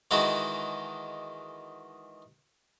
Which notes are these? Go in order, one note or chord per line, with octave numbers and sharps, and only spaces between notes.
D#3 E3 G#3 F#4 A4